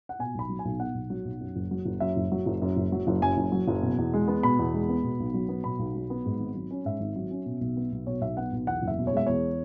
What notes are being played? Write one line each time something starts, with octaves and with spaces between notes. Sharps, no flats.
F#5
B2 G#5
B1 B5
F#3
G#5
B1
B2 F#5
B1
F#3
B1
F#2
F#1
F#3
F#1
F#2 E5
F#1
F#3
F#1
F#2
F#1
F#3
F#1
F#2 G#5
F#1
F#3
F#1
B2
E2
G#3
B3
B2 B5
E2
G#3
B3
B2
B1
F#3
B3
B2 B5
B1
F#3
B3
G#2
G#1
F#3
C#4
G#2 E5
G#1
F#3
C#4
B2
B1
B3
B1
B2 C#5
B1 E5
B3 F#5
B1
E2 F#5
F#1
E5
B2
C#5
G#3 E5
E2 C#5